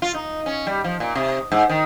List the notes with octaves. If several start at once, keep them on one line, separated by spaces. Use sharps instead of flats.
F4
D#4
C#4
G3
F3
A#2
C3
G#2
D#3